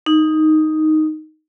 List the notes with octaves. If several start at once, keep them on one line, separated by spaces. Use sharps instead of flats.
D#4